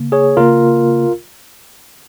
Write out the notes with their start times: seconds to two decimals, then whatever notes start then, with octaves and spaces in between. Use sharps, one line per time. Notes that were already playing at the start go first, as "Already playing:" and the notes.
Already playing: C#3 A#3
0.12 G#4 C#5
0.37 C#3 A#3 F4 A#4